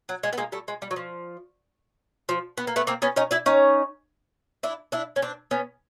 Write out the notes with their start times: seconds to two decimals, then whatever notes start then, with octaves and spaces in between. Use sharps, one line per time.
0.09 F#3
0.23 G#3
0.33 B3
0.38 G#3 A#3
0.52 G3 A3
0.68 G#3
0.82 G3
0.91 F#3
0.96 F3
2.29 F3
2.57 B3
2.67 A#3
2.76 A3 B3
2.87 A#3 C4
3.02 B3 C#4
3.16 C#4 D#4
3.31 D4 E4
3.46 C#4 D#4
4.63 D4 E4
4.92 D4 E4
5.16 C#4
5.22 C4 D4
5.51 B3 C#4